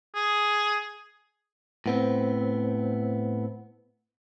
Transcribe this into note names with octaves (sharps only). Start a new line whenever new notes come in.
G#4
A2 B3 C4